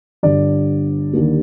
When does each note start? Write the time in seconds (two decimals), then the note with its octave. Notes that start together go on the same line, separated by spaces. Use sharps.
0.23 G1 G2 D3 D5
1.13 D#2 D3 G3 A#3